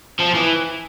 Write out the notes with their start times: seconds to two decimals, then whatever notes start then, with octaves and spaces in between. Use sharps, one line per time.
0.19 F3
0.34 E3